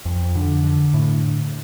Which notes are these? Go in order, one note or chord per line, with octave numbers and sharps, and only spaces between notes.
F2
D3
D3
A2